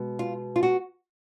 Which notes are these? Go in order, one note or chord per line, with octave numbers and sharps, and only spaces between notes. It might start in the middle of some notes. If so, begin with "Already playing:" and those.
Already playing: B2 G#3
F4
F4
F#4